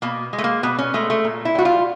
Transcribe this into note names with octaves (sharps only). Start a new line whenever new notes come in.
B2 A#3
G#3
A3
A#3
B2 B3
C#4
G#3 A3
A3
A#2
E4
G3 F#4
F4